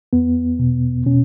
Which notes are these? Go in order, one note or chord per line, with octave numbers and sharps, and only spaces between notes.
E2 B3
B2
B2 C#4